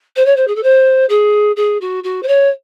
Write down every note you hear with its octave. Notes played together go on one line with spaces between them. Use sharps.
C5
C#5
C5
G#4
A4
C5
G#4
G#4
F#4
F#4
C5
C#5